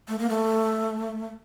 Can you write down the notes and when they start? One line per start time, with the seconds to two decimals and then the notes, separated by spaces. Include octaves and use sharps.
0.08 A3
0.19 A#3
0.29 A3